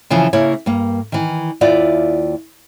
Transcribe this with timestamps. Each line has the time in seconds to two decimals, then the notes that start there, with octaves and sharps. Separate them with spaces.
0.10 C#3 E3 F3
0.33 C#3 A#3 E4 C#5
0.66 G2 A#3
1.12 D#3 E3
1.61 D#2 E4 F4 D5